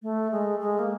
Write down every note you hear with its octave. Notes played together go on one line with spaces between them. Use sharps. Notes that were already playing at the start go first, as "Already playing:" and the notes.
A3
G#3
G#3
A#3